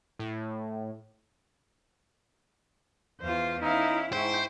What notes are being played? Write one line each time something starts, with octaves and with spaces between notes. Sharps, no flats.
A2
E2 F4 C5
C#4 D#4 E4 F5
G#2 E4 C5 G5 C#6